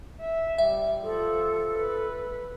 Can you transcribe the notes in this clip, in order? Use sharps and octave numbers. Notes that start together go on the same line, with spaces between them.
E5
G3 E5
F3 A4
B4